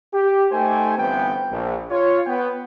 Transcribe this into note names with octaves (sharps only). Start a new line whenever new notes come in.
G4
A3 D#4 G4 C5 G5 G#5
G1 G2 E3 B3 C4 G5
A#1
F4 C#5
B3 G5